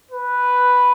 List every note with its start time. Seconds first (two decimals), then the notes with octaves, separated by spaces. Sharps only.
0.11 B4